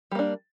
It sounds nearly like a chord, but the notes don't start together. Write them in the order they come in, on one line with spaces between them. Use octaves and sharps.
G3 A#3 D4